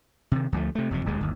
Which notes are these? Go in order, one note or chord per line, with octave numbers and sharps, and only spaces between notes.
C3 D#3
D2 F3 A3
C3 A3
F#1 F2 C3
D1 D#2 G#3
G1 D#2